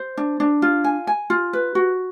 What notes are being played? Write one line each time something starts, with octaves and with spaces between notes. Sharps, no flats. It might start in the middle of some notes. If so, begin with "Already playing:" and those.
Already playing: C5
D4
D4
F4
G#5
G#5
F4
B4
F#4